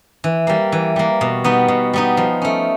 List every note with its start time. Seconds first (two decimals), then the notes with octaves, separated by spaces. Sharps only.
0.24 E3
0.47 G3 A#3
0.72 E3
0.96 G3 A#3
1.21 B2
1.44 G3 B3 D#4
1.68 B2
1.93 G3 B3 D#4
2.17 F3
2.42 A3 C#4